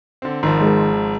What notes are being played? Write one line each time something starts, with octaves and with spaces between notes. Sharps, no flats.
D3 C4
G#1 D#3 F3 C6
G#3 A#4